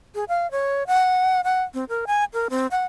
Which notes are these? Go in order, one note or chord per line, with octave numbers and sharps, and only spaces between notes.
G#4
F5
C#5
F#5
F#5
C4
A#4
G#5
A#4
C4
F#5